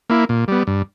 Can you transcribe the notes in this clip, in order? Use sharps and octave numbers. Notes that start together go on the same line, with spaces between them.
A#3 E4
A#2
G3 B3
G2